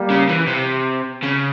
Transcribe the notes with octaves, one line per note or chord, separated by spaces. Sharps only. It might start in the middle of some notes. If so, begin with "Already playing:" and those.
Already playing: G3 A#3
C#3
E3
C3
C#3